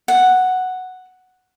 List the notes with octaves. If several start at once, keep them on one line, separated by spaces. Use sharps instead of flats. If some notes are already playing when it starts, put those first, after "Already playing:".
F#5